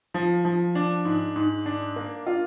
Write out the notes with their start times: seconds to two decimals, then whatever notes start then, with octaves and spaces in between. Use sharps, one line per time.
0.14 F3
0.45 F3
0.75 D4
1.05 G#2
1.36 G#2
1.66 D4
1.96 A#3
2.27 F4